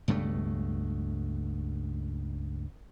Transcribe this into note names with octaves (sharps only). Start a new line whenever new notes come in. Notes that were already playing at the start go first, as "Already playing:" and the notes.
C#2 G2 B2 A3